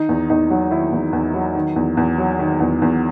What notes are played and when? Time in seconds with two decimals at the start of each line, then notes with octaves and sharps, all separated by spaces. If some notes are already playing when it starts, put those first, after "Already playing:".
Already playing: D#3 D#4
0.09 E2
0.30 E2 D#4
0.50 F#3
0.71 D#3 E4
0.92 E2
1.13 E2
1.34 F#3
1.55 D#3
1.76 E2
1.97 E2
2.18 F#3
2.39 D#3
2.60 E2
2.82 E2